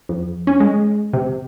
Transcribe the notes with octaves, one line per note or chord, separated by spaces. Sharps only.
F2
C#4
G#3
C3